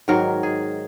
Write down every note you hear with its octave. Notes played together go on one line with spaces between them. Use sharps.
G#2 D#3 F#3 A#4
G#4